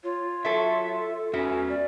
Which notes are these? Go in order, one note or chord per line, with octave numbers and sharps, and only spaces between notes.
F4 C#5
F#3 A4 E5
A4
B3 C#4 F#4 E5
D5